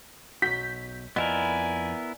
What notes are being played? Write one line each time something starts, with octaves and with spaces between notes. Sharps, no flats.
B1 F#4 G6 B6
F2 F3 B3 E4 A#4 D5 D#5 G#5